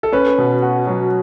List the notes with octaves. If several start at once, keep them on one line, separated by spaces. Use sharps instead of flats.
A4
C#4 B4
B2
F#4
F#3